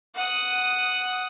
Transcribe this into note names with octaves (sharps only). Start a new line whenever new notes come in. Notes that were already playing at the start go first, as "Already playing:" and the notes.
F#5 D#6